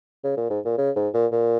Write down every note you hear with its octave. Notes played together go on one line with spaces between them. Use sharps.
C#3
A#2
G#2
A#2
C#3
G#2
A#2
A#2